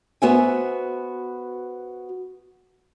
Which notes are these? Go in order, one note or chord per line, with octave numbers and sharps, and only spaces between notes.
B3 F#4 C5 E5 F#5 G#5